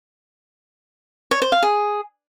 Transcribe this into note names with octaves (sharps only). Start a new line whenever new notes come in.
C#5
C5
F5
G#4